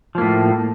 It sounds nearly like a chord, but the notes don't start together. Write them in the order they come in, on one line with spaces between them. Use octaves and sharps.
F3 A#3 A2